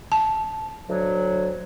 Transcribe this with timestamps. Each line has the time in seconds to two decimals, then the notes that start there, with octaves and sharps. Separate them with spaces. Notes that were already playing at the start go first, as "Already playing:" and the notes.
0.12 A5
0.88 D2 F#3